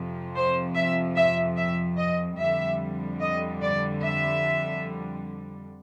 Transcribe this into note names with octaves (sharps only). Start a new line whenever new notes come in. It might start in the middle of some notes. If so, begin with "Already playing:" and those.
Already playing: F2 C3 F3
C5
E5
E5
E5
D#5
F2 D3 G3 E5
D#5
D5
E5